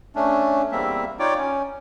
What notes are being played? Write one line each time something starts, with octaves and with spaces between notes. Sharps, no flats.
A3 C#4 D4
E2 G3 A#3 C4 E5
D#4 F4 C#5 D5 G5 D6
C#4